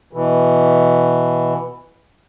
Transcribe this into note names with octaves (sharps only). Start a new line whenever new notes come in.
B2 E3